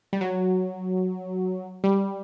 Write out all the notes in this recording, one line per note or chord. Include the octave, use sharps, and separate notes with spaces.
G3
F#3
G3